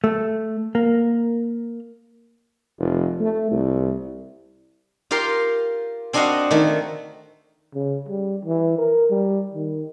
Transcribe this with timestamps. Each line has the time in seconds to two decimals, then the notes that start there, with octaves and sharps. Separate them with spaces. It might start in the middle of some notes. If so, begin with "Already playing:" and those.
0.04 A3
0.75 A#3
2.79 F1
3.21 A3
3.51 C2
5.11 F4 G4 A#4 F5 C6
6.13 C4 D4 F#4 D#5 F5 F#5
6.51 D#3 A3
7.75 C#3
8.08 G3
8.45 E3
8.78 A#4
9.10 G3
9.54 D#3